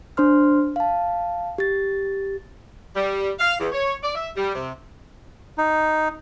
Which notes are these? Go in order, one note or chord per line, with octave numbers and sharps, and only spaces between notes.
D4 C5 C6 F6
F5 A5
G4 A6
G3
F5
E2
C#5
D5
E5
G3
C3
D#4